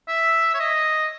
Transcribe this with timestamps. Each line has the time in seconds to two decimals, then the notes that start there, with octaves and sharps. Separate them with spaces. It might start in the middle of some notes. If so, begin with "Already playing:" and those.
0.08 E5
0.54 C#5
0.60 D#5